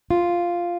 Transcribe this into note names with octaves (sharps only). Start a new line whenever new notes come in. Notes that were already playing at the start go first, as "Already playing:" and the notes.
F4